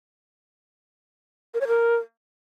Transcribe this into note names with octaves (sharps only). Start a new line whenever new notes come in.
A#4
C#5
A#4